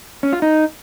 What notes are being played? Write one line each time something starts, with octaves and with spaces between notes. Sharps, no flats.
C#4
F4
D#4